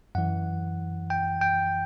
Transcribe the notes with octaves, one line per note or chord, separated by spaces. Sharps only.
F#2 E3 F#5
G5
G5